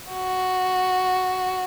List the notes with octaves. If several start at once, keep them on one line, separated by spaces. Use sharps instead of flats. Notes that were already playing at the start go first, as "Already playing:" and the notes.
F#4